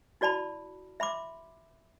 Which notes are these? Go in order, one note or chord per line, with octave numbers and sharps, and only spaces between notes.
E4 F#4 D5 A5 B5
E5 B5 C6 D6